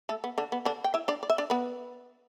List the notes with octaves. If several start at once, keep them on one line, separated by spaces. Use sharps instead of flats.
A3 A4
B3
D3 D4
B3
D3 D4
G5
E4 E5
D4 D5
D5
E5
D4 D5
B3 B4